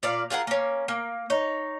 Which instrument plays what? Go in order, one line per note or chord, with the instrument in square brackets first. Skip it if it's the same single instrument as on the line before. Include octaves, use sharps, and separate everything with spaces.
[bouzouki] A#2 D5 F5
F4 G#4 A#4 F#5
A#3 C#4
A#3
D#4 C#5